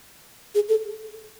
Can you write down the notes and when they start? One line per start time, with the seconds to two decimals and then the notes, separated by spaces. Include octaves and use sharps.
0.55 G#4
0.69 A4